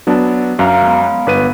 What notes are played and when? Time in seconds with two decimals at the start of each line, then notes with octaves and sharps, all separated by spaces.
0.07 F#3 B3 D4 E5 A5
0.59 F#2 F5 A#5 F6
0.81 G#3 B3
1.27 G1 B4 D#7